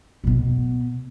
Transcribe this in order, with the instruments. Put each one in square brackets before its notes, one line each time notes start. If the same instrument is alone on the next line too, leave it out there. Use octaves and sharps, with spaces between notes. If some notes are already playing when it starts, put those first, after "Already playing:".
[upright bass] B2 B3